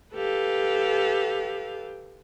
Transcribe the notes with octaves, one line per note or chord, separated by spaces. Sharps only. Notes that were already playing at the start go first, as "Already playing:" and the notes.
G4 A4 B4 F5